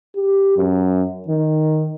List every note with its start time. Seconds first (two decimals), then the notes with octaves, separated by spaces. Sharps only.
0.16 G4
0.57 F#2
1.28 D#3